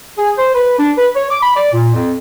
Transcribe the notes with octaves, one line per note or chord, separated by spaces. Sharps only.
G#4
C5
B4
D4
B4
C#5
D6
B5
D5
A#2
F2